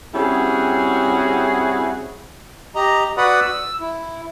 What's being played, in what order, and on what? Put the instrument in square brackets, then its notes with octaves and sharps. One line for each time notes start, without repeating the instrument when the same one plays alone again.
[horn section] G3 C4 C#4 E4 F#4 G#4
[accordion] G4 D#5 A#5
F#4 B4 D5 F#5 B5 D#6
E6
E4